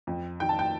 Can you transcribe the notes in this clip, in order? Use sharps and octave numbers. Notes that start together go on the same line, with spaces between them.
F2
D#3 G5
A5
G5